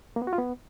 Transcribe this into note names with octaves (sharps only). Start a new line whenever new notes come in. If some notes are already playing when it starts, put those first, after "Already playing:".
A#3
B3
F#4
F4
B3